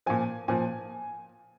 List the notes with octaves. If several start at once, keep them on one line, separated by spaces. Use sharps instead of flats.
A#2 F3 G#5
A#2 F3 G#5